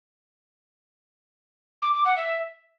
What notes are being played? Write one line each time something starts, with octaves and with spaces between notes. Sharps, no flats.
D6
D6
F#5
E5